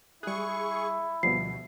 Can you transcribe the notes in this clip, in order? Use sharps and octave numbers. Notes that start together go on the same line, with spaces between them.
G3 E4 G#4 C#6 F#6
D2 B2 F3 G3 B3 C7